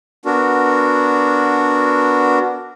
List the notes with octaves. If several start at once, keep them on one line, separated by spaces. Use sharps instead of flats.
B3 D4 F#4 A#4